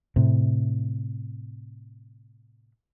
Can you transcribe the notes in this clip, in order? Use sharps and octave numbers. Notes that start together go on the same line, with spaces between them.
A2 C3